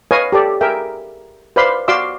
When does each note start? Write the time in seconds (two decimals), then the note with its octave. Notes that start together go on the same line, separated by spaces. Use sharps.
0.11 B4 C#5 D#5 F5 G#5
0.32 G4 A4 D5
0.61 G#4 A#4 E5 G5
1.56 B4 C5 D5 F5 B5 C6
1.88 F#4 D5 F5 C6 D6 E6